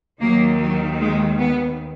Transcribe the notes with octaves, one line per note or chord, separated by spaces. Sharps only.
D#2 D#3 F#3 A#3
F#3
G#3
B3